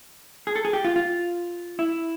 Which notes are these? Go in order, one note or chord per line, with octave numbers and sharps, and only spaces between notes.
G#4
A4
G#4
G4
F4
F4
E4